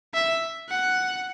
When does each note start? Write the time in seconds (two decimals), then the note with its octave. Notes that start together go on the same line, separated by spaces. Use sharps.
0.14 E5
0.69 F#5